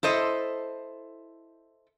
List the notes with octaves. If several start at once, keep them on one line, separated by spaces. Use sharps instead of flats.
E4 A4 C5 D#5